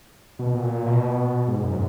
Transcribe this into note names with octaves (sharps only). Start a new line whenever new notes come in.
B2
A#2
B2
G#2
F#2